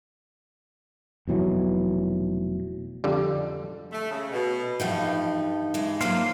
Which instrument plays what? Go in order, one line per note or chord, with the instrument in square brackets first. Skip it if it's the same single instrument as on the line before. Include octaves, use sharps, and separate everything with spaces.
[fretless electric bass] F1 B2 E3 F#3
[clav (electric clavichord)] F2 D3 G3
[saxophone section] A3
C#3
B2
[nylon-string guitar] G2 D#4 F#5 [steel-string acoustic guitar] E3 F3 A3
[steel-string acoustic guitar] E3 G#3
[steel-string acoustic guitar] F#3 F4 A4 [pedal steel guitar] A#3 C5 F5